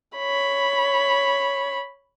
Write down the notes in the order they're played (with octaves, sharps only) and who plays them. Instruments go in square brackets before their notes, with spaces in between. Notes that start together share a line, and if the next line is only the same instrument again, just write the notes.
[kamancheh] C#5 B5